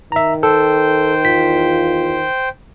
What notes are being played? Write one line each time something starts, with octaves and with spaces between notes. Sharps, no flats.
D#3 E5 A#5
A4 C5 G5 G6
E2 F4 B6